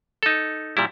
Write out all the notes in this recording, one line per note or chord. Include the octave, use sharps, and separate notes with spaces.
D#4 A4
A#2 G3 E4